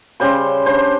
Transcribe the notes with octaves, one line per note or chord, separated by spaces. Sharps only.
C#3 G3 C5 C6
D4 C5